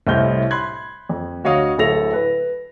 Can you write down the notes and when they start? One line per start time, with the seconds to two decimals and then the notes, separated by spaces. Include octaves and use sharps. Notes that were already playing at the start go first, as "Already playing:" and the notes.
0.07 C2 A2 C5 D#5 F6 G6
0.51 B5 C6 F#6 G#6
1.09 F2
1.44 D2 F#4 C#5 D#5 F5 D#6
1.78 D1 A2 A4 A#6 F7
2.13 B4